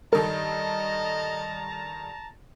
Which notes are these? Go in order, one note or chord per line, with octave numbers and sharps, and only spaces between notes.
G2 D#3 A4 A#4 D#5 A5 A#5